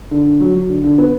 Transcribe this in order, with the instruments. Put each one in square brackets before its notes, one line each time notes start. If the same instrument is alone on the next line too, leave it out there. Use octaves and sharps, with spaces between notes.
[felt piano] D3
D3
F#3
F#3
D3
D3
B3